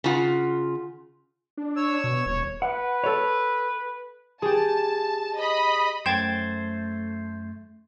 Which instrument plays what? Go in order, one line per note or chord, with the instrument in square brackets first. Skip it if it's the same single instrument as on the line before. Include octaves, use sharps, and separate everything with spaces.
[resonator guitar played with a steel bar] C#3 F4 F#5
[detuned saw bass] D4
[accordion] C#5 E6
[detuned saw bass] B2
[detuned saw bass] D#1 [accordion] C#5
[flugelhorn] B4 [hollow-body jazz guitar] F#5
[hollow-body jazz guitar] A4 C#5
[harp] G4 G#4 [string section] A5
[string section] D#5 B5
[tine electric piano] F#2 G#6 A6 [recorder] A3 [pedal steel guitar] C5 [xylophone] G5 E7